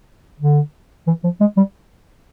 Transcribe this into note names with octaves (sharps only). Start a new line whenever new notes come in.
D3
E3
F3
G#3
G3